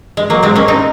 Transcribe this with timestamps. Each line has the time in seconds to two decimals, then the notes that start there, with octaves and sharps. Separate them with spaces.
0.17 G#3
0.30 F#3 A#3
0.43 G#3 C4
0.56 A#3 C#4
0.68 C4 D#4